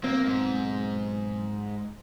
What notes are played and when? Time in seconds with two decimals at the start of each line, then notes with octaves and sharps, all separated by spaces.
0.04 B1 A#3 C4
0.26 G#2